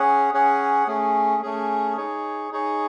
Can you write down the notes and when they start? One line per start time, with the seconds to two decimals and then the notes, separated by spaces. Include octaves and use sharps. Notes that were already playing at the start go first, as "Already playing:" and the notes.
Already playing: C#4 G#4 C#5 F#5
0.33 C#4 G#4 C#5 F#5
0.87 A3 C#4 G#4
1.43 A3 C#4 G#4
1.97 D#4 G#4 C#5
2.52 D#4 G#4 C#5